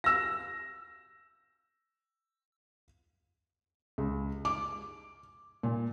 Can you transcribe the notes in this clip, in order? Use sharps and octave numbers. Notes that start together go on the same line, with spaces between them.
E6 A#6
C#2
D6
A#2